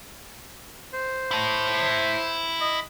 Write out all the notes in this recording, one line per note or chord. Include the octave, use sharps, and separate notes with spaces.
C5
E4 A5
D#5